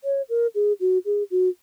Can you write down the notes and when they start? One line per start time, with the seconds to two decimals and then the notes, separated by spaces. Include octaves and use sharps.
0.04 C#5
0.29 A#4
0.55 G#4
0.80 F#4
1.05 G#4
1.31 F#4